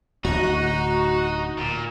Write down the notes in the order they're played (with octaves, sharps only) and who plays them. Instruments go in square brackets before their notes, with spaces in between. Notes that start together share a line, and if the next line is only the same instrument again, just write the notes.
[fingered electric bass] D1 [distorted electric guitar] D#4 [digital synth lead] F#4
[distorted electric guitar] A#2